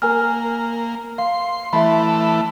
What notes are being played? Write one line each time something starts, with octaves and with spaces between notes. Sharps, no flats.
A#3 A#4 G#5 F6
F5 C6
E3 A3 E5 B5